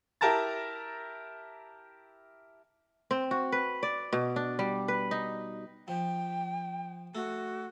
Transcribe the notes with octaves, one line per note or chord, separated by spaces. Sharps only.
E4 G4 A#4 A5 A#5 A6
C4
F#4
B4
D5
B2
D4
G3
B4
D#4
F3 G5
A3 F#4